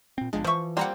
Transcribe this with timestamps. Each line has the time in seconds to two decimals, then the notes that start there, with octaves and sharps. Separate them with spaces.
0.18 A#2 C4
0.33 G1 F3 G#3 D4
0.44 E3 F3 C5 E5 C#6
0.77 G3 A#3 C4 F#5 A#5 C6